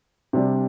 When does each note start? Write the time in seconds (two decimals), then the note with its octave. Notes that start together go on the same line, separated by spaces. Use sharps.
0.33 C3 G3 D4